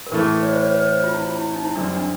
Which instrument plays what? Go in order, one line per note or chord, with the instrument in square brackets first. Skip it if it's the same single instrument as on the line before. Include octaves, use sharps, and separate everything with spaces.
[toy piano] A#4
[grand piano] A2 E3 A3 [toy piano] B4
[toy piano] G#4
A4
B4 C#5
C5 D5
B4 C#5
B4
C5
B4
F4
E4
F4
E4
E4
D#4
E4
[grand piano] F#2 D3 G3 C4 [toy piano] D4
[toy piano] D4